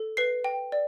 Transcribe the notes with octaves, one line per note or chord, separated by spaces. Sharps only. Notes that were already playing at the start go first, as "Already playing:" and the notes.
Already playing: A4
B4 C7
G5
D5